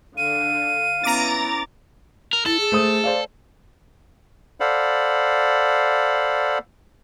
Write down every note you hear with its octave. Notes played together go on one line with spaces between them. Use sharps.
D3 F5 D#7
B3 C#4 E4 A#5 D6 A6
A#4
E4 A4 A6
G#4
A3 C5 D#6
C5 D5 F5
A4 C5 D5 F5 F#5 B5